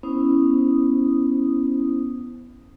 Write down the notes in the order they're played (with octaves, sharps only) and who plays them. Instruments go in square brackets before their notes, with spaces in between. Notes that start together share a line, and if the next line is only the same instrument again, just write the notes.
[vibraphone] B3 C#4 E4 C5 D#6